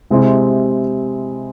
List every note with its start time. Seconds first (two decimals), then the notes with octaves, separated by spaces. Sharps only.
0.10 C3 G#3 C4 E4